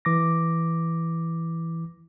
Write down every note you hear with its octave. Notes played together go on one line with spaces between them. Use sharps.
E3 D6 A#6